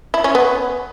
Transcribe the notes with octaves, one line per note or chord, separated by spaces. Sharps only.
E4
C#4
B3